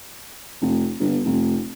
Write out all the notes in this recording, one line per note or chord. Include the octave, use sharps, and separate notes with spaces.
F1
G1
F1